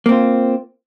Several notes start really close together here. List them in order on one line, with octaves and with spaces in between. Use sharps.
A#3 C4 F4